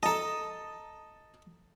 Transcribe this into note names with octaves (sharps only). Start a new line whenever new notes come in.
A4 D#5 A5 A#5